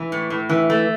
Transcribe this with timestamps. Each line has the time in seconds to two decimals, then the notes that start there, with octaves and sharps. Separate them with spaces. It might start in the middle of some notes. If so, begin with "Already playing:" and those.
Already playing: E3
0.12 A2
0.30 A2
0.49 E3
0.70 A3